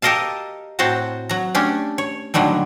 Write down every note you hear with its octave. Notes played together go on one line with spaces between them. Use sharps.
G4 A4 A#4 D#5 F5 A5
A2 C4 F#4 C5 A5 A#5
F#3 A#5
A3 C#4 D4 G4
C#5
A#2 D3 D#3 F#3 G3 A3